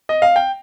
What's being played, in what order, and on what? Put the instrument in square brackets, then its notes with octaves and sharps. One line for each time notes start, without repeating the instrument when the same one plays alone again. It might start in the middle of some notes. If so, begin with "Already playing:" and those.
[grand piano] D#5
F5
G5